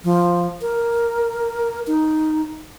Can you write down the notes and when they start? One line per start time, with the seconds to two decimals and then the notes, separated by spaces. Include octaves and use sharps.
0.04 F3
0.62 A#4
1.87 D#4